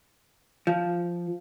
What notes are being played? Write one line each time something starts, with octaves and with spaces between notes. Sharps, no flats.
F3